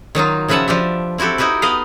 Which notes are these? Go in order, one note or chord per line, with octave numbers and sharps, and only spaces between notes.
D#3 F#3 D#4 F4
C#3 F3 B4 E5 F#5 A5
F3 D4 G4 E5
C4 E4 F#4 G4 A4
D#4 E4 F#4 G4 B4
B3 B4 D#5 F5